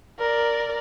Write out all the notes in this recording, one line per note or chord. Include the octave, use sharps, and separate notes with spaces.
A#4 D5